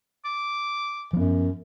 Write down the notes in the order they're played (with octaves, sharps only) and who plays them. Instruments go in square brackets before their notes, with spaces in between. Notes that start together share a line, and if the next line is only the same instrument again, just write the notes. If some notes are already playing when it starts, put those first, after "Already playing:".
[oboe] D6
[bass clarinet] F#2 [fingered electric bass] F3 B3